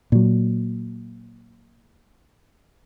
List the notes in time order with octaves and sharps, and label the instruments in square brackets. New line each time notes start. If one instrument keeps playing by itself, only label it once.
[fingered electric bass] A#2 F#3